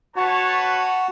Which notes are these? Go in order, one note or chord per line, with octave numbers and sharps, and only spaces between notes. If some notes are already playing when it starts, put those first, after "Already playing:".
F#4 B4 C#5 A5